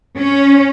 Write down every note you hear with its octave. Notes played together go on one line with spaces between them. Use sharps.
C#4